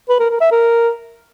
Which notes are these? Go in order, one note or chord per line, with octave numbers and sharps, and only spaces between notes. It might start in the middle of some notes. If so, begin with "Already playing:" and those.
B4
A#4
A#4
E5
A#4